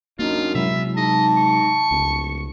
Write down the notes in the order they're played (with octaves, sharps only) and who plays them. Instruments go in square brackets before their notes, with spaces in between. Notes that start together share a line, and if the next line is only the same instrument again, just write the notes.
[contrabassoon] F#2 [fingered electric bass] A#3 D4 [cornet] D#4 [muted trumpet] F4
[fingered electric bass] C3 F#3 G#3 [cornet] E4 [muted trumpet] E5
[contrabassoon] G#2 [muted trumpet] D#5 [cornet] A5
[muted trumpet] C#6
[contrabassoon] D1 [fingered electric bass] C#2